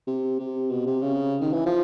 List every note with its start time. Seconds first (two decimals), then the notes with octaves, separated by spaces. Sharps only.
0.07 C3
0.39 C3
0.70 B2
0.86 C3
1.02 C#3
1.41 D#3
1.53 E3
1.66 F3